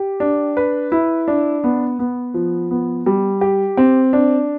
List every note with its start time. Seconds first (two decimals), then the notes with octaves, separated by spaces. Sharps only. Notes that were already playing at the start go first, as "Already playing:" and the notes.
Already playing: G4
0.20 D4
0.57 B4
0.92 E4
1.28 D4
1.64 B3
1.99 B3
2.34 F3
2.71 B3
3.06 G3
3.41 G4
3.77 C4
4.13 D4